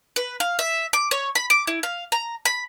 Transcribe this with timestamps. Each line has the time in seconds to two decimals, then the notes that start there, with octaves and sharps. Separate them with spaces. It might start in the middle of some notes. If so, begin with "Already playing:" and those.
0.16 B4
0.40 F5
0.59 E5
0.93 D6
1.11 C#5
1.35 B5
1.50 D6
1.67 E4
1.83 F5
2.12 A#5
2.45 B5